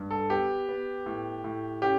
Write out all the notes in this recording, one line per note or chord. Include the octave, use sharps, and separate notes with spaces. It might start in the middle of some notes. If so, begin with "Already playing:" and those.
Already playing: G2
A4
B3 G4
B3
A2
A2
C#4 G4